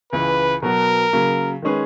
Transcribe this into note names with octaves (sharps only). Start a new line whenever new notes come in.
C#2 C#3 E3 B4
B2 F#3 B3 F#4 A#4
C#3 F#3 A#3
D#3 G#3 C#4 G#4 B4